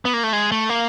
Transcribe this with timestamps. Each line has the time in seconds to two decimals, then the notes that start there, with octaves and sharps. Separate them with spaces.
0.05 B3
0.14 A#3
0.24 A3
0.33 G#3
0.52 A3
0.69 A#3